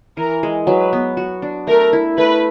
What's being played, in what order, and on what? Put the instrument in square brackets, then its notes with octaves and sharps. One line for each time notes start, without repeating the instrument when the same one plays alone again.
[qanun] E3 [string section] A#4
[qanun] G#3
[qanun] F#3 [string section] B4
[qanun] B3
F#4
D4
[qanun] A3 [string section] A#4
[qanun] E4
[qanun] A3 [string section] B4